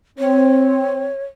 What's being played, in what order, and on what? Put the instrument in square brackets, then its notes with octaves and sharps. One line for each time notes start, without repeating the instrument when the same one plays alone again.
[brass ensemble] C4 [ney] C#5